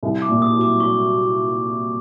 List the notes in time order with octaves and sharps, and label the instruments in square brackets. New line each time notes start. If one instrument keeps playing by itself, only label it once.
[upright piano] C2
[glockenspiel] D6
[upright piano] A#2
[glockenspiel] D#6
[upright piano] F#3
[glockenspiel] D6
[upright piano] F#3 [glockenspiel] C#6